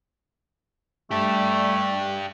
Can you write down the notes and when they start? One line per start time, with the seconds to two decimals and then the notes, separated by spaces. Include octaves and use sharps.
1.11 G3 A3 D4 G4